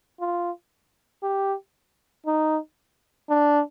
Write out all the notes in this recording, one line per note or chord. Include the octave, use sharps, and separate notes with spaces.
F4
G4
D#4
D4